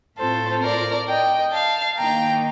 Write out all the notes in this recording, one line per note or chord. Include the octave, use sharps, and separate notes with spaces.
A2 A3 C4 F4 A4 C5
A#4 D5
D#5 G5
F5 A5
D#3 A#3 D#4 G5 A#5